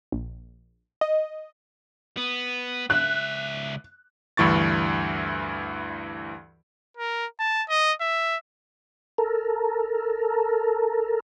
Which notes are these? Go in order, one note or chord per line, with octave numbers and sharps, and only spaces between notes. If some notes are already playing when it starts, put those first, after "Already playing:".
A#1
D#5
B3
C#2 E5 F#6
D2 G2 E3 C#6 A6
A#4
A5
D#5
E5
A4 A#4